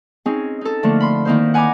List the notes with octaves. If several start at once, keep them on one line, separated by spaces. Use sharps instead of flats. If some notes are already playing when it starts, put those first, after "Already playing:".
C4 C#4 D#4 G#4
D#4 A4
D3 F3 A3 A#3
B5 C6
D#3 A#3 D#4 E4 C5
F#5 G#5 A#5 B5 D6